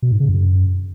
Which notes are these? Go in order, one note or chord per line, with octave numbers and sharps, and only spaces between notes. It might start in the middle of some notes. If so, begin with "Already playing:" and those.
B2
G#2
C#3
F#2